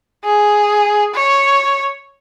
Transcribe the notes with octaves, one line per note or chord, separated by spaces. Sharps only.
G#4
C#5